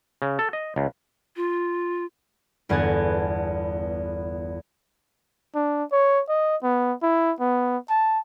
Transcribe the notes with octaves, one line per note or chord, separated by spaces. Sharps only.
C#3
A4
D#5
C#2
F4
G1 E2 B3 G#4 A5 G#6
D4
C#5
D#5
B3
E4
B3
A5